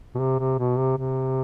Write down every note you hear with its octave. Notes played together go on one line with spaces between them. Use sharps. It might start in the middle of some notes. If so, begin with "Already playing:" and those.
B2
C3
C3
B2
C3
C3